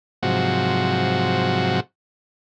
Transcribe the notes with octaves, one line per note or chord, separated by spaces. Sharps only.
G#2 C3 F3 F#3 F#4